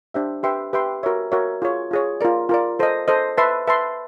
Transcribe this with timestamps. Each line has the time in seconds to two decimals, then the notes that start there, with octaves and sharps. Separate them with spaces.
0.14 D4 G4 C5 E5
0.43 G4 B4 E5 G5 C6
0.73 G4 B4 E5 G5 C6
1.03 F#4 A#4 C#5 E5
1.32 F#4 A#4 C#5 E5
1.62 F4 G#4 C#5
1.91 F4 G#4 C#5
2.21 F4 A#4 D5
2.49 F4 A#4 D5
2.79 A4 C5 D#5
3.08 A4 C5 D#5
3.37 B4 E5 A5 C6
3.67 B4 E5 A5 C6